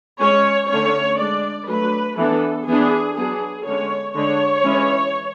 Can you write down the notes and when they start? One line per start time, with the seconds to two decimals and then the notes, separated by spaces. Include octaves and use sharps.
0.20 G#3 C#4 C#5
0.70 D3 A3 C#4 C#5
1.19 G#3 D4 D5
1.68 F#3 A3 D4 B4
2.18 E3 B3 D4 A4
2.67 E3 B3 D4 G#4
3.17 F#3 B3 D4 G#4
3.66 D3 G#3 C#4 C#5
4.15 D3 G#3 D4 C#5
4.64 E3 G#3 C#4